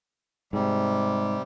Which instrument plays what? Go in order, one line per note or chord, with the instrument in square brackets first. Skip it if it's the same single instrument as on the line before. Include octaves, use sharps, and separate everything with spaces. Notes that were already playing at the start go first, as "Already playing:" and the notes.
[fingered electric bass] G#2 [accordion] C3 G3